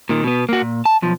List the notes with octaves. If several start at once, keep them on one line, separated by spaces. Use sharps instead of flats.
A#2 D#3
B2 B3
A#3 F#4
A#2
A5
B1 F3